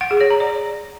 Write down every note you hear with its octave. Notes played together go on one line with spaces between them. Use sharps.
F#5
G#4
C#5
A#5
D5